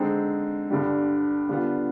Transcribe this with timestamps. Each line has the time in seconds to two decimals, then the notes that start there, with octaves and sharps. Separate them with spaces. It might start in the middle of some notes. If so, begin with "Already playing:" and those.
Already playing: D3 G#3 C4 D#4
0.70 G2 D3 G3
1.49 D3 G3 B3 F4